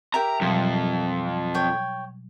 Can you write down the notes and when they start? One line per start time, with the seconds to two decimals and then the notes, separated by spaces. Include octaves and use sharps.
0.14 G4 A#4 E5 A#5
0.41 F2 B2 F#3 G3
1.55 C#5 G5